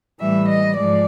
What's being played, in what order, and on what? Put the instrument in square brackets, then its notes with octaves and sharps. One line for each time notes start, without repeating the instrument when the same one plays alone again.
[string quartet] A2 E3 G3 E5
D#5
G#2 F3 G#3 D5